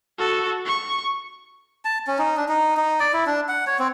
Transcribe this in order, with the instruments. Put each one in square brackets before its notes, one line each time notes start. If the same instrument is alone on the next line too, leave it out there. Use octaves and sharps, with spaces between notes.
[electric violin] F#4 A4
C#6
[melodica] A5
C#4
D#4
D4
D#4
D#4
D5
E4
D4
F#5
C#5
C4